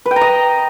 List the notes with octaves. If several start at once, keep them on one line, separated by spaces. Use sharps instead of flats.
B4
G5
A#5
D#5